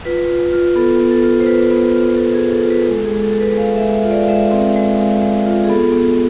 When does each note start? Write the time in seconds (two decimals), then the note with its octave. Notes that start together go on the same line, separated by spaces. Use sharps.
0.05 F4 B4
0.30 F4
0.53 F4
0.76 B3 A4
1.00 B3
1.11 A4
1.24 F4
1.40 C5
1.46 F4 B4
1.71 B3
1.94 F4
2.16 F4 A4
2.34 G#4
2.40 F4
2.52 A4
2.63 F4
2.70 B4
2.88 G#3 A4
3.05 G#4
3.11 G#3
3.22 A4
3.33 G#3 A4
3.40 B4
3.58 G#3 F5
3.76 E5
3.82 G#3
3.94 E5
4.04 F4
4.11 D5
4.22 F5
4.28 G#3 E5
4.51 C4
4.76 G#3
4.99 G#3 F5
5.22 G#3
5.46 F4
5.64 G#4
5.69 B3 A4
5.92 B3